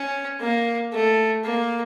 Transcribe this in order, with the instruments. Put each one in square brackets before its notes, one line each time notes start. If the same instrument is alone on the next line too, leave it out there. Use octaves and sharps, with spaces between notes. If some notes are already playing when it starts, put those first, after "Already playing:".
Already playing: [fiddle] C#4
A#3
A3
A#3